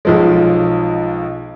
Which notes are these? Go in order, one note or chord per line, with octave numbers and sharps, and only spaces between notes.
B1 F3 G#3